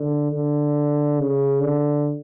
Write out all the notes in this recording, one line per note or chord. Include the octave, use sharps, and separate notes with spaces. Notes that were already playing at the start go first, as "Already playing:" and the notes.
Already playing: D3
D3
C#3
D3